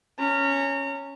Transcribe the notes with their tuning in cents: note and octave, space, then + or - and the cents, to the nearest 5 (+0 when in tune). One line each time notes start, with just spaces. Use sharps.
C#4 +0 A#5 -35